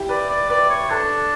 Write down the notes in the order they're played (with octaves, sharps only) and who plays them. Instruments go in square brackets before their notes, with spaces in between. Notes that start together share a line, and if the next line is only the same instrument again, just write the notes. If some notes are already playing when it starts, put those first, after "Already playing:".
Already playing: [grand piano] E4 G4
[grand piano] B4 [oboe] D5
[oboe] D5
[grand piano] B4 [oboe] D5
[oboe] C#5
[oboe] D4 [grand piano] A4